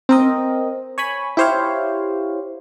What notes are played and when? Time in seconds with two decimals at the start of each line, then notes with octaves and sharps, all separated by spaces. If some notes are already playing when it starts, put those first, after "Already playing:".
0.09 C4 A#4 D#5
0.98 C#5 G#5 B5
1.37 E4 G4 C5 C#5 F5